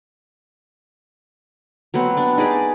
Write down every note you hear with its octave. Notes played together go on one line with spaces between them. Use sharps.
F#3 B3 C4
D4
D#4 G#4 D5 B5